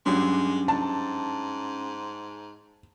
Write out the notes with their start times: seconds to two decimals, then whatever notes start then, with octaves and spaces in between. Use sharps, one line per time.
0.06 G2 F#3 G#3 C#4
0.68 G#2 A5